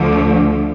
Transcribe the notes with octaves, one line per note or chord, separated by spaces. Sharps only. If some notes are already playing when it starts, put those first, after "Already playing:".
Already playing: D2 D3 F3 A3